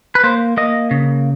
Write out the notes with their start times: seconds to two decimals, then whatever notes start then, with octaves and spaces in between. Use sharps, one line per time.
0.15 B4
0.23 A#3 C5
0.57 A#3 D#5
0.91 C#3